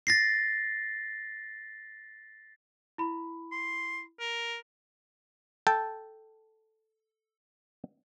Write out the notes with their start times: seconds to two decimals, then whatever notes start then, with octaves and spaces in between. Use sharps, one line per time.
0.07 A6 A#6 C7
2.98 E4 B5
3.52 C6
4.20 A#4
5.67 A4 G5 A5